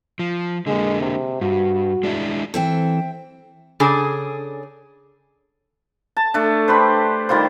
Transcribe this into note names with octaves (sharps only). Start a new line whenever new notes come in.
F3
D3 G#3 A#3
C3
G2 F#4
G#3 D4 E4
E3 C4 A4 C5 E5 G5
C#3 D4 G#4 A4
A5
A3 D4
D4 G4 B4 C5
D#3 G3 F4 C5